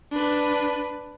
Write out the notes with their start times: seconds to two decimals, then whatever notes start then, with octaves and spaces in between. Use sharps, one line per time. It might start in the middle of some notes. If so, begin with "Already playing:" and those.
0.11 D4 B4